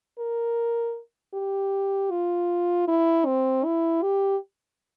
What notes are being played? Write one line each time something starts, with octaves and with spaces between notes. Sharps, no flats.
A#4
G4
F4
E4
C4
E4
G4